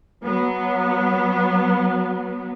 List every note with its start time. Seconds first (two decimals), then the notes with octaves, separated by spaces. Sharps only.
0.24 F#3 B3